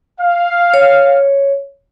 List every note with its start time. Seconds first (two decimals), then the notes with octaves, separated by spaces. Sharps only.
0.20 F5
0.74 C#5